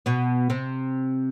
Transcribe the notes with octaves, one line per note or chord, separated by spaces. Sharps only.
B2 B3
C3 C4